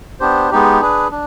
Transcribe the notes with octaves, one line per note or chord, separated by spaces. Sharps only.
B3 D4 G4 C5
G#3 B3 D#4 G4
D4 G#4 B4
D4